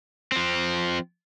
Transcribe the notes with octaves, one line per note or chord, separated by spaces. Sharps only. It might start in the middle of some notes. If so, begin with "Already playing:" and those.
F3 C4